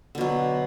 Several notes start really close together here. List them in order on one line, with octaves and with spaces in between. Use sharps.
D3 B2 F#3